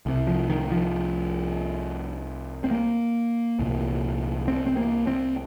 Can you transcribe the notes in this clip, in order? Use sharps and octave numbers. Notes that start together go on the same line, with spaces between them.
C2 C3
F3
D#3
F3
C4
A#3
C2 A#2
C4
C4
A#3
C4